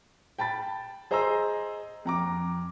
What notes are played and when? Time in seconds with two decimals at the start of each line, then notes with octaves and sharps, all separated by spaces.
0.38 G5 A5 B5 A6
1.11 G#4 C5 D#5 A#5 C6 E6
2.05 F2 A#5 D6